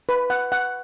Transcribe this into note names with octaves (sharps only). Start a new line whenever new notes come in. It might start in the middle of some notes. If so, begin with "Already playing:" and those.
B4
F#5
F#5